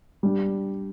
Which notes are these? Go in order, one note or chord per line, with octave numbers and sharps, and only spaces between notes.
G3 D4 G4